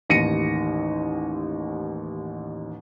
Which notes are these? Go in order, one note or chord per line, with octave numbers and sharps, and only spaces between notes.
A1 D#2 A#6 C#7 D#7